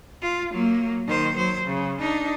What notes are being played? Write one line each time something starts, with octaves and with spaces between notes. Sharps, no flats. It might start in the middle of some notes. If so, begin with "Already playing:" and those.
F4
F#3 A#3
D#3 C5
F#3 C5
C#3
D4 D#4